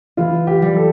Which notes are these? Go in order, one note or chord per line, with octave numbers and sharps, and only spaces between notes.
E3 F4
G4
G3
A4